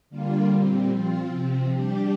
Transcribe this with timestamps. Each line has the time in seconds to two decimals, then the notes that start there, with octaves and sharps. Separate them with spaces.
0.10 D3 G3 A#3 F4
0.49 A#2 G3 C4
0.89 F3 C4 F4
1.28 C3 F3 C4
1.68 G3 D4 G4